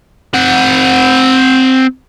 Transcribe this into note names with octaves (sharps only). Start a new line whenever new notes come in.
C4 F#5